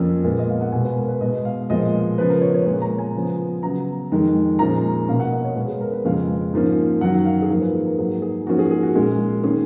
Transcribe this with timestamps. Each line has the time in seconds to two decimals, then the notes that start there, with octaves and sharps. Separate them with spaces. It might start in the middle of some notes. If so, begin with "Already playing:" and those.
Already playing: F2 F3 A#3 C#4
0.24 A#2 G#3 B3
0.38 D#5
0.50 F5
0.61 F#5
0.72 B2 G#3 B3 G#5
0.85 B4
0.97 A#4
1.08 B4
1.21 B2 G#3 B3 D#5
1.45 F5
1.70 A#2 F3 G#3 B3 D#5
2.18 C#3 F3 B3 B4
2.30 A#4
2.42 C#5
2.54 C#5
2.66 A#2 G#3 B3 C#5
2.82 A#5
2.99 G#5
3.14 C#3 F3 B3
3.63 C#3 F#3 B3 A#5
4.12 F2 D#3 G#3
4.59 A#2 F3 G#3 C#4 A#5
5.08 B2 A#3 C#4 F5
5.20 F#5
5.32 D#5
5.45 C#5
5.56 B2 G#3 B3 B4
5.68 G#4
5.81 A#4
5.92 B4
6.04 F2 C#3 F3 G#3 C#4 F5
6.53 G#2 F3 A#3 C#4
7.01 F#2 D#3 F#3 F#5
7.25 F5
7.42 G#4
7.50 G#2 F3 A#3 A#4
7.61 B4
7.74 G#4
7.86 A#4
7.98 G#2 F#3 A#3 G#4
8.22 G#4
8.47 G#2 F3 A#3 C#4 F#4
8.59 G#4
8.71 G#4
8.83 F#4
8.95 A#2 G#3 C#4 G#4
9.44 D#3 A#3 C#4 G#4